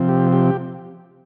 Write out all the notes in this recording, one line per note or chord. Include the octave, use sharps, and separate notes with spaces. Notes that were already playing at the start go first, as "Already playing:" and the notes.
Already playing: C3 F3 C4
G4
G4